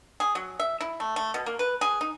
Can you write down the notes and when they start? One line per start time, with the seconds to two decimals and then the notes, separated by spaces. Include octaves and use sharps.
0.20 G#4
0.35 F#3
0.60 E5
0.81 E4
1.00 A3
1.16 A3
1.34 B2
1.46 A#3
1.59 B4
1.81 G#4
2.01 D#4